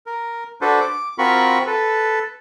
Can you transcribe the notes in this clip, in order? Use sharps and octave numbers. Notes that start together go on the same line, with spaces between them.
A#4
D4 F#4 A4 B4 C5
D6
C4 F4 F#4 A#4 B5 C#6
A4 B4